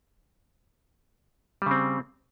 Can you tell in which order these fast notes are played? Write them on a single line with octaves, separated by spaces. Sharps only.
G3 C#3 C4